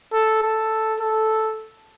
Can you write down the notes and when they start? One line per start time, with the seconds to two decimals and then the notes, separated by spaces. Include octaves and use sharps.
0.13 A4
0.43 A4
1.00 A4